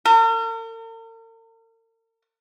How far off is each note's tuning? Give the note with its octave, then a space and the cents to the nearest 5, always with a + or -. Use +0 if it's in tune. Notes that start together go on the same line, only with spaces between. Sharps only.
A#4 -45